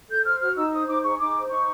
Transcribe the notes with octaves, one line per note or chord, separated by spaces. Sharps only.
A4 G6
C5 F6
F#4 F6
D#4 E6
C5 D#6
D#4 D6
G#4 C#6
D#4 D6
C5
D#4 C#6